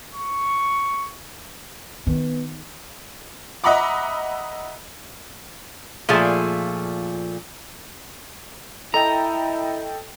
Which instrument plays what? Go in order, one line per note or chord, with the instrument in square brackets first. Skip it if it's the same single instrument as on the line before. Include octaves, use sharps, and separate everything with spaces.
[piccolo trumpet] C#6
[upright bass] D#3 [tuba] B3
[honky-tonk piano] D#5 E5 F#5 A#5 B5 D6
[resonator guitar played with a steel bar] A#2 F3 A3 G#4
[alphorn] E4 [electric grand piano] A4 D#5 G5 [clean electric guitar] A#5